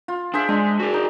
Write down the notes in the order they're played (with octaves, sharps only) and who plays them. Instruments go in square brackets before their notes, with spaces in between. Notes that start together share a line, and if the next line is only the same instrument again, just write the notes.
[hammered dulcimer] F4
[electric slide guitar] D4 [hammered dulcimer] G#4 C5 E5
[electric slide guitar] G#3 [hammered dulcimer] D4
[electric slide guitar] F#4 G#4
[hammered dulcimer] D#4